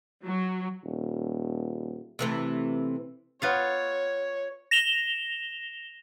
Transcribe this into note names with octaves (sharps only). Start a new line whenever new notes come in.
F#3
D#1
C3 E3 A3
B3 F4 C#5 F5
A#6 E7 F7 G7